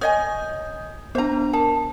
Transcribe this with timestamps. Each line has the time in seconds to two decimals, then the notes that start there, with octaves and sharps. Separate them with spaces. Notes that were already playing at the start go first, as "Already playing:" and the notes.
0.01 C#5 D#5 G#5 D#6 G6
1.15 B3 D4 C5 A#5
1.53 A#4 A5